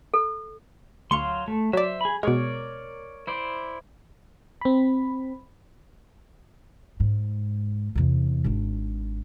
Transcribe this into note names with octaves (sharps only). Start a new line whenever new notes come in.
A4
D2 F#3 F5 C6 C#6
A3
F#3 C5 D5 E5
G#4 B5
B2 G#3 A#4 C#5 D5
E4 C5 D5
C4 B5
G#2
E2 C3
G#1 D4